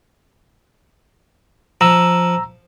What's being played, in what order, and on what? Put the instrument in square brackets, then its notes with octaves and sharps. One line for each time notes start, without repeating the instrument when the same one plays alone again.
[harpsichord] F3 [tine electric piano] A#5 E6